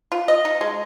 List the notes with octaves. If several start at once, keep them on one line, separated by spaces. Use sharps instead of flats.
F4
D#5
D#4
G#3